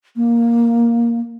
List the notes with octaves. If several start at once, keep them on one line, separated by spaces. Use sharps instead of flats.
A#3